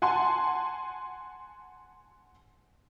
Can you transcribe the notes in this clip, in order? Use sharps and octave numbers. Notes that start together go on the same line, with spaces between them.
F#5 G#5 A5 C6